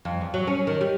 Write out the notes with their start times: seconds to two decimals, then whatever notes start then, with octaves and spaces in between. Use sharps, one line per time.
0.05 F2
0.21 E2
0.34 F#3
0.47 C#4
0.67 D#3
0.81 G3